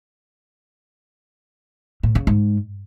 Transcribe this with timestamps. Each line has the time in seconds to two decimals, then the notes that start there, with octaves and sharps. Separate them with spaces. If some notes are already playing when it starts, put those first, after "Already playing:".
2.03 A2
2.15 C#3
2.27 G#2